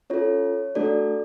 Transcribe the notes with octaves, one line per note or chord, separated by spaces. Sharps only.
C#4 F4 A4 C#5
A3 D4 F#4 A4 D5